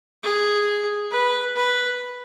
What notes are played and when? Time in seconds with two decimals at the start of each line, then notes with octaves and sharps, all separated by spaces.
0.23 G#4
1.11 B4
1.56 B4